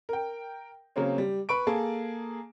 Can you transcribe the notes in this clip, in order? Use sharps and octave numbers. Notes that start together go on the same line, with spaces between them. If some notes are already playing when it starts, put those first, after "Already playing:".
A#4 G5
C#3 F#3 A#3 C4 C#4
G3
B4 B5 C#6 D7
A#3 G#4 A4 A5